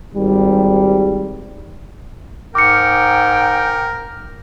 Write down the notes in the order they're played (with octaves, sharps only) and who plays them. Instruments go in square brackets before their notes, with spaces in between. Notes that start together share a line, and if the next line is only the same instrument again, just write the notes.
[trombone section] G#1 G3
[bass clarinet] G#2 [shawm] A#4 [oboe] G5 [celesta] D6 C#7